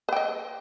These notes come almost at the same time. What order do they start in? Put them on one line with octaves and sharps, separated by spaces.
B4 G5 D#5